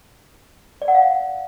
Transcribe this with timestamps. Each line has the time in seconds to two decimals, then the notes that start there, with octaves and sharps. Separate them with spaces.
0.82 D5
0.88 F#5
0.94 F5